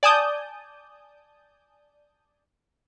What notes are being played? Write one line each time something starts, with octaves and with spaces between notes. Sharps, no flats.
D5 G#5 A5 D#6 G6